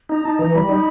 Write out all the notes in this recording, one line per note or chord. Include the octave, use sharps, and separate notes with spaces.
D#4 A#5
D#4 A5
E3 A#5
G3 B5
D#4